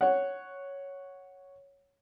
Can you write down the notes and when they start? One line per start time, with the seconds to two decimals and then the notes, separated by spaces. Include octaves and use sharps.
0.01 C#5 F#5